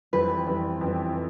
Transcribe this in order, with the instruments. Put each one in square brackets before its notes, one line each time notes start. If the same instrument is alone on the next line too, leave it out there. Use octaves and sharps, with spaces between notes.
[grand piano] F2 E3 G3 C4 [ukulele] B4
[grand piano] F2 E3 G3 C4
F2 E3 G3 C4
E3